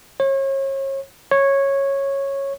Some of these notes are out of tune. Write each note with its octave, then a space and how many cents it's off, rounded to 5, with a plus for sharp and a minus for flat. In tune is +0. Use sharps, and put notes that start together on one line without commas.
C#5 -35
C#5 -10